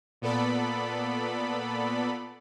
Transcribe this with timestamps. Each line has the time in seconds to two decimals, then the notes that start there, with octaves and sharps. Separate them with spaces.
0.22 A#2 B3 A4 D5 B5